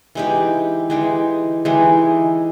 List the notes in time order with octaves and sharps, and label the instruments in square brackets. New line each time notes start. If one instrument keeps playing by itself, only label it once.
[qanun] E3 G#3 D#4 G4
E3 G#3 D#4 G4
E3 G#3 D#4 G4